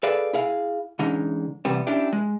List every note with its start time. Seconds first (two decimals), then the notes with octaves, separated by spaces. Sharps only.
0.03 G#4 A4 B4 D5 F5
0.33 E4 G#4 F5
0.99 D3 E3 G#3 C#4 D#4
1.65 C3 E3 G3 B3 C4
1.87 C#4 D4 E4 G4
2.13 G#3